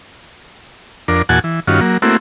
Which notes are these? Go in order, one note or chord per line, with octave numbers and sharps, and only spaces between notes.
F2 D4 A#4
E2 A#2 F#4 F#5 G#5 A5
E3
G2 D#3 C#4 F4 F#4
F#3 A#3
A3 A#3 C4 E4 F#4